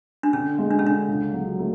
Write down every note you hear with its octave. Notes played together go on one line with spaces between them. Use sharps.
D4
D3 C#4
G#3
D4
C#4
D3 D4
C#2
F#3
A3